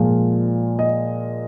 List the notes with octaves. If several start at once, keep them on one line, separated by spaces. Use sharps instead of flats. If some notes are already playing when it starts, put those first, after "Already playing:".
Already playing: A#2 F3 G#3 F5
D#5